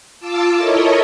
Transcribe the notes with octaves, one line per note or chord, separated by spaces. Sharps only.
F4 A5 D6 E6
E4 A4 A#4 C#5 D#5